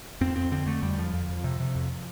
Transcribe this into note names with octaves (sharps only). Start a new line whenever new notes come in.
F2 C4
F2 C4
D3 C4
D3 A3
F2 G3
F2 F3
F2
F2
C3
C3
F2